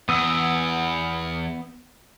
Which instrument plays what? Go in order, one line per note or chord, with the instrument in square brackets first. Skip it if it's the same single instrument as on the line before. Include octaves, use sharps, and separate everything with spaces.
[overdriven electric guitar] E2 [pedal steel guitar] B3 E6 [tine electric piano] D#6